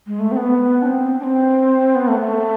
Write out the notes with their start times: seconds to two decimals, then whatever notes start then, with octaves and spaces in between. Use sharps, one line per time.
0.07 G#3
0.19 A3
0.32 C4
0.37 B3
0.82 D4
0.86 C4
1.20 D4
1.23 C4
1.95 B3
2.08 A3
2.21 A3